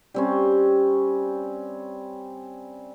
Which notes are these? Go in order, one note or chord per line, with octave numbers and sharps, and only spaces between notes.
G3 C4 C#4